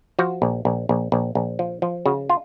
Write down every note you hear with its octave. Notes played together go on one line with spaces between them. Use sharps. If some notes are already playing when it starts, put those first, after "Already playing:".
F3 F#4
A#1
A#1
A#1
A#1
A#1
F3
F3
C#3 F#4
F4